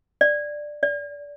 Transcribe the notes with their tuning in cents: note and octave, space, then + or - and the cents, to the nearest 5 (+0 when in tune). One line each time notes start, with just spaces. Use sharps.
D5 +10
D5 -25